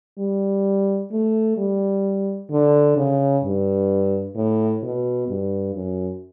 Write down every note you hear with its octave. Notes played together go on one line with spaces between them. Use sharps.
G3
A3
G3
D3
C#3
G2
A2
B2
G2
F#2